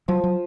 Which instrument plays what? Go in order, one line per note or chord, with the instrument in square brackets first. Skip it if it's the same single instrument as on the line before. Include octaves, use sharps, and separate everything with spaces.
[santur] F3 [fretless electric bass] F#3
[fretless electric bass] F#3